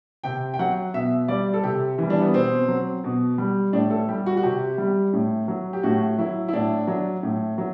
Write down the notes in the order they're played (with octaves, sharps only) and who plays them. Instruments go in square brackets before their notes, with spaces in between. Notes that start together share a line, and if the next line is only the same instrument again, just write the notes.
[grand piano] C3 G5
G5
F#3 F#5
B2 E5
G3 D5
A4
C3 G4
E3
G3
D4
B3
B2 C4
F#3
B2
G3
A2 D4
A4
G3 G4
F#4
F#4
C3 G4
G3
A2
F#3
G4
A2 F#4
F#3 E4
E4
A2 D4
F#3
A2
F#3